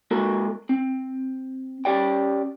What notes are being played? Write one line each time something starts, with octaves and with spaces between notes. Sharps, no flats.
G#3 A#3 F#4 A4 A#4
C4
C#4 G4 D5 G5